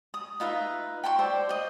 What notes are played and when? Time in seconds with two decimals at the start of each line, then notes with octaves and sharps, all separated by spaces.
0.14 D#6
0.40 D#4 F4 B4 E5
1.04 G5 A5 C6 C#6
1.19 C5 D5 E5
1.49 C5 D#5